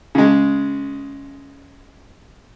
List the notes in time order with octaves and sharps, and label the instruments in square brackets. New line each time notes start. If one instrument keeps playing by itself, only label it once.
[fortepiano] C#3 G#3